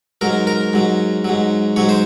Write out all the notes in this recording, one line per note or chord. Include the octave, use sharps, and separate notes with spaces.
G#2 F#3 A#4
A#4
G#2 F#3
G#2 F#3
G#2 F#3 C#5
C5